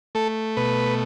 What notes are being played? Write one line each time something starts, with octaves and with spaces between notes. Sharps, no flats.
A3 A4
B2 B4